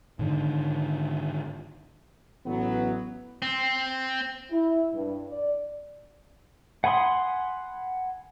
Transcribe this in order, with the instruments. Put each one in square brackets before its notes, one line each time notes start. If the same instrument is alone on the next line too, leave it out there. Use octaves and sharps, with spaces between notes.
[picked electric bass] G#2 D3 D#3
[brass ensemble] A1 F#3 B3
[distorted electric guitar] C4
[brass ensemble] E4
G2
D5
[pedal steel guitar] F#5 G#5 B5 C6 D#6